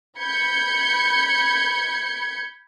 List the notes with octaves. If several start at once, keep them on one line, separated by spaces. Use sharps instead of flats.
B5 G6 G#6 C#7